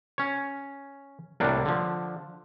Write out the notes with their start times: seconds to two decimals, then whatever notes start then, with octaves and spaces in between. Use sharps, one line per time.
0.18 C#4 C#5
1.40 C2 A2 A#3 D4 F#5
1.65 D3 F3